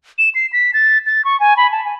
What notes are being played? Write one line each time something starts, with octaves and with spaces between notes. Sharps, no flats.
E7
C7
B6
A6
A6
C#6
G#5
B5
A5
G#5